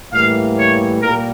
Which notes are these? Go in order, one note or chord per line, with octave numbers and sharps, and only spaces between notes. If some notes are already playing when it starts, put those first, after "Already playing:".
A2 E3 G3 A#3 F5
C#5
A#2 G3 A#3 A#4